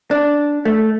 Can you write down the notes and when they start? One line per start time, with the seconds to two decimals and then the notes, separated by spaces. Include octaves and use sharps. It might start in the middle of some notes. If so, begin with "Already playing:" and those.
0.11 D4
0.65 A3